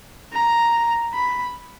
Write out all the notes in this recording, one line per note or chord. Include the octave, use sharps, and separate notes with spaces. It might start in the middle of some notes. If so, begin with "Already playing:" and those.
A#5
B5